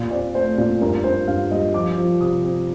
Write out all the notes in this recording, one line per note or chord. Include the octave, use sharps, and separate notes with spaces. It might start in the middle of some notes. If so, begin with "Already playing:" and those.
Already playing: A#2
C4 D5
A3 C5
A#2 D5
G2 A#4
G2 C5
G2 F5
G3 D#5
F3 D6
F3
C3 D#6
C4